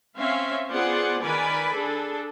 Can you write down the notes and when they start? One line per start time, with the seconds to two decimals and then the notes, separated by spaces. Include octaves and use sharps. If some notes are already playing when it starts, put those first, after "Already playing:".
0.16 C4 C#4 E5 F5
0.69 B3 F4 G#4 C5 D5 F#5
1.22 D#3 A#4 B4 D5 G#5 B5
1.72 D4 G#4 A4